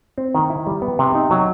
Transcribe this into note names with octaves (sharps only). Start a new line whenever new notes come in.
C4
D#3
E4
G3
B3
C3
D#4
F#3